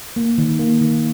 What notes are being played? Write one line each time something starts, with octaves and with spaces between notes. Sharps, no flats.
A#3
D#3
A#3
D#3